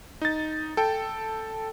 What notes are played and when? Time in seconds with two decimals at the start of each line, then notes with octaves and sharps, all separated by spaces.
0.22 D#4 A6
0.77 A4 G5